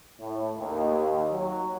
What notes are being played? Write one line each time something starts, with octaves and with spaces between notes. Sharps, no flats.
A2
D#2
F#3